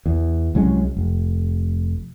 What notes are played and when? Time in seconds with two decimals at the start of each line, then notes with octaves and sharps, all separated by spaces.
0.06 E2
0.55 C2 F#3 G#3 C#4
0.97 F1